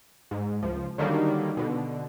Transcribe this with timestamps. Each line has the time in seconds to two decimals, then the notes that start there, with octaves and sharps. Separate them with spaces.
0.31 G#2
0.63 C#2 F3
0.98 D3 D#3 F#3 G3 A#3
1.57 B2 D3